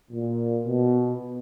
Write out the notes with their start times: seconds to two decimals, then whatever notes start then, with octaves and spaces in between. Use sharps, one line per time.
0.11 A#2
0.65 B2